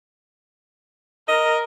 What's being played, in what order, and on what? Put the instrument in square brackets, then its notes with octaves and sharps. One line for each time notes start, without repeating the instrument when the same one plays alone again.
[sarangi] A#4 [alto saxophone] D#5